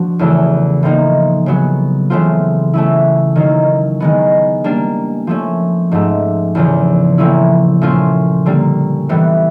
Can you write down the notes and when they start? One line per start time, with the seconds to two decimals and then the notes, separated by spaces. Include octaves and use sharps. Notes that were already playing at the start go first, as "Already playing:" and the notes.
Already playing: F3 D4 F#4
0.19 E2 C#3 E3 A3
0.83 A2 F3 A#3 D#4
1.46 C#3 F#3 B3
2.10 C#3 E3 A3 C4 F4
2.74 A3 C#4 E4
3.36 D#3 F#3 A#3
4.00 D#3 G#3 B3
4.64 G3 A#3 D4
5.27 F3 A3 C#4
5.92 G#2 F3 A3
6.55 E2 C#3 F3
7.18 A2 F3 A#3 C#4 E4
7.82 A#2 F3 A3 C#4 F4
8.46 D3 G3 A#3
9.09 A2 E3 G3 B3